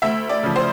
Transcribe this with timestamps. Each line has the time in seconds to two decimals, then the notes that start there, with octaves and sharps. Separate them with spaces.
0.02 D2 E5
0.29 D5
0.43 C#3 F3
0.56 C5